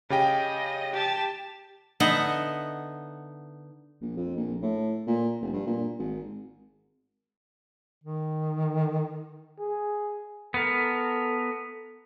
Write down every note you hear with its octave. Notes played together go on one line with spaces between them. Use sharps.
C#3 G4 D#5 G5
G4 A5
D3 B3 D#4 D#5 E5 F#5
A#1
F2
A#1
A2
A#2
F1
G2
A#2
G#1
D#3
G#4
B3 A4 A#4